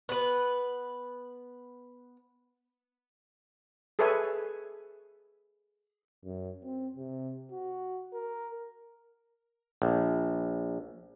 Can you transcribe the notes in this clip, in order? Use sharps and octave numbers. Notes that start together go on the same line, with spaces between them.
B3 B4
G#4 A4 B4 C#5 E5 G#5
F#2
C4
C3
F#4
A#4
A#1